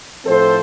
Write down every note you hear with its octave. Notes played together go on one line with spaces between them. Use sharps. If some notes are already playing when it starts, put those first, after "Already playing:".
A2 F3 C4 A4 C5